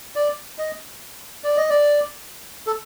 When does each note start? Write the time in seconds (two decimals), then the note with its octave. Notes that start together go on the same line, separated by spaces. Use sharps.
0.16 D5
0.58 D#5
1.44 D5
1.57 D#5
1.70 D5
2.67 A4